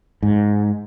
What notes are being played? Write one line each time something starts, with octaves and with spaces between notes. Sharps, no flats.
G#2